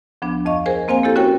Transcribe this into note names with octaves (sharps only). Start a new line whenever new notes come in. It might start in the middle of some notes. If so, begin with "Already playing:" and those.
D2 F3 B3 D4
F2 D#5 F5 C#6
G#4 A#4 C5 G#5
A#3 C4 C5 F5 G#5
A#3 E4 G4 A4
C#4 F#4 A#4 C#5 G5